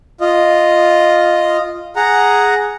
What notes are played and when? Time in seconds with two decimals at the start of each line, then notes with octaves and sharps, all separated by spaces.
0.21 F4 D#5
1.96 G#4 F#5 A#5